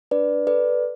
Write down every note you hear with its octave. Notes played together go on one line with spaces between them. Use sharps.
D4 B4 D5
A4 B4 D5